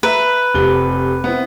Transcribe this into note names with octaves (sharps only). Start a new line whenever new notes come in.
B4 E5 A#5
F1 C3 G7
B3 C4 E4